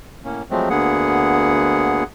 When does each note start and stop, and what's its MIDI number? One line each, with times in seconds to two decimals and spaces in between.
0.24 0.43 45
0.24 0.43 58
0.24 0.43 61
0.50 0.69 53
0.50 0.69 54
0.50 0.69 56
0.50 0.69 57
0.50 0.69 60
0.70 2.04 38
0.70 2.04 50
0.70 2.04 58
0.70 2.04 59
0.70 2.04 68
0.70 2.04 78